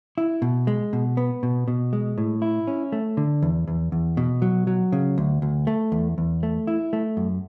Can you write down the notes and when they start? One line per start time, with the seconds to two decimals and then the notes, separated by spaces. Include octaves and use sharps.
0.18 E4
0.42 B2
0.67 G#3
0.93 B2
1.17 B3
1.43 B2
1.68 B2
1.93 G#3
2.18 A2
2.42 E4
2.67 C#4
2.92 A3
3.17 D3
3.42 E2
3.67 E2
3.92 E2
4.17 B2
4.42 F#3
4.67 F#3
4.92 C#3
5.18 D2
5.42 D2
5.67 A3
5.92 E2
6.18 E2
6.43 A3
6.67 E4
6.93 A3
7.17 F#2